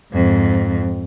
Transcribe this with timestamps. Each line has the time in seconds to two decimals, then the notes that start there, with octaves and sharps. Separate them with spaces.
0.13 F2 G#2